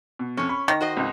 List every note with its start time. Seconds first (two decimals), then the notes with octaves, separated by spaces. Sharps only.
0.19 B2
0.37 F2 C#4 C#5
0.49 B5 C#6
0.68 D#3 A#6
0.81 F#4 C5 D#5
0.97 G#1 C#2